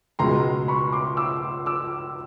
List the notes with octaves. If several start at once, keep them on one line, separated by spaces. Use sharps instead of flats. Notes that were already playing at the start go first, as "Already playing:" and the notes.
C#2 B2 G#3 A#5 C6
B5 C#6
C6 D6
D6 E6
D6 E6